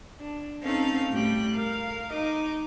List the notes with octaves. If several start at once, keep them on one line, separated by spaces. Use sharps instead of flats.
D4
C4 C#4 D#4 A4 F5
A2 G3 G5 F#6
A#4 F5
D#4 D#5 D6